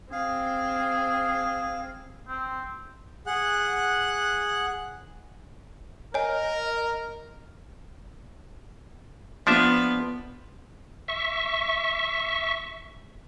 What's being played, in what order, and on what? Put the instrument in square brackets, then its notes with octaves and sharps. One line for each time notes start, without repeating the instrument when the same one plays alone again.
[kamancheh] C4 [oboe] G#4 [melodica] F5
[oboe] C4
[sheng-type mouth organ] G#4 F#5 F#6
[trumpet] A#4 [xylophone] C#5 G#5 [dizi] D#5
[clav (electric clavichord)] F3 D4 E5 [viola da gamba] B3
[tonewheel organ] E5 C#6